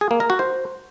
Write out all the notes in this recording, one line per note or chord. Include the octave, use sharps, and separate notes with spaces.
G#4
A#3
A#4
F#4
C5